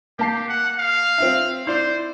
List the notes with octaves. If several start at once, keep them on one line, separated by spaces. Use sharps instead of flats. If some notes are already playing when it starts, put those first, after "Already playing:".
A#3 G4 A5 C7
F#5
F5
C4 F4 E5
E4 C5 D5